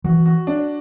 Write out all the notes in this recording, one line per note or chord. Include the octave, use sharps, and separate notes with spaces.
E3 F#4
F#4
D4